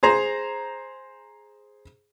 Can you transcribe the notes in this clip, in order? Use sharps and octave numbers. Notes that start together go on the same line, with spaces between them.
G#4 C5 A#5